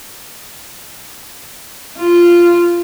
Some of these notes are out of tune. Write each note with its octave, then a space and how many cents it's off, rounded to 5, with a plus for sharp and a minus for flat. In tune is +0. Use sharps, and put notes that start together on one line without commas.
F4 -10